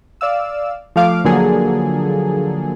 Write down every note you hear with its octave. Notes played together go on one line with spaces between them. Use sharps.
D5 F5 E6
F3 A3 F5 D6
D3 F3 F#3 A#3 G#4 A4